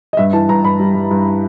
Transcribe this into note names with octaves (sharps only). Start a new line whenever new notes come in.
D#5
G2 E5
E3 A5
G2 A#5
G2 B5
G3
G2
G2